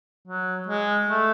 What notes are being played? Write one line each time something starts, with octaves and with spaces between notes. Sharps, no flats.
F#3
G#3
A3